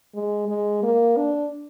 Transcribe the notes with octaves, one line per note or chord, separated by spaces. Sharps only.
G#3
G#3
A#3
D4